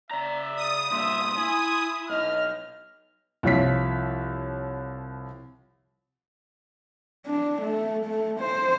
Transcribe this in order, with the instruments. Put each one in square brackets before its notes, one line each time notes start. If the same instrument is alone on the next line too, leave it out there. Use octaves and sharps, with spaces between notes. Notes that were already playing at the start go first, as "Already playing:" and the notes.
[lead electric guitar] C#3 A#5 [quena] D5 [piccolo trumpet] E5
[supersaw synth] D#6
[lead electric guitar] G2 A#2 [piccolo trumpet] E5 [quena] C6
[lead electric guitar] E4 [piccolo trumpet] G#5
[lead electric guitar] B1 [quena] D#5 [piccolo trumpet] F6
[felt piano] C2 F3 C#5 B6
[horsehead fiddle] D4
A3
A3
C5